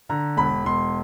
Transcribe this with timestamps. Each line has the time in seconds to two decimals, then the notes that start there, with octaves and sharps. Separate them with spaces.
0.09 D3 A#5
0.37 E1 B5
0.65 E1 C6